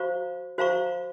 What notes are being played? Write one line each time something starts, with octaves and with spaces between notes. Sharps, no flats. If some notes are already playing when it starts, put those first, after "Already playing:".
Already playing: F#4 C5 F5 A#5 C#6
F#4 C5 F5 A#5 C#6